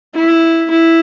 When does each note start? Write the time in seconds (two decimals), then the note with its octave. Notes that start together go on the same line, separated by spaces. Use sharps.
0.15 E4
0.70 E4